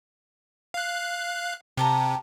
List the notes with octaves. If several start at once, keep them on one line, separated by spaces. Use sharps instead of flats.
F5 F#6
C3 G4 A5 A#5